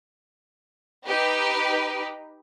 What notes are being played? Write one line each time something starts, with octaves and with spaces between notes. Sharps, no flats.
D#4 G4 B4